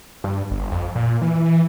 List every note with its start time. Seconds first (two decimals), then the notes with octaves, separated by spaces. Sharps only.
0.24 G2
0.51 G1
0.72 F2
0.95 A#2
1.22 E3
1.43 E3